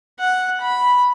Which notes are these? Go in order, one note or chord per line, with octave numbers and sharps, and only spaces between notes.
F#5
B5